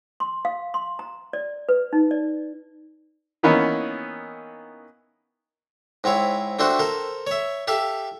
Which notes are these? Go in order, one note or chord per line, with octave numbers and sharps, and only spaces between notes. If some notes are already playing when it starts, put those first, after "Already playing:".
C6
F5
C6
A#5
D5
B4
D#4
D5
D#3 E3 A#3 B3 C#4 D#4
G#2 C4 E4 C#5
A3 C4 D4 F#4 A4 C5
A4 A#4 C5
C#5 E5
G4 A4 E5 F5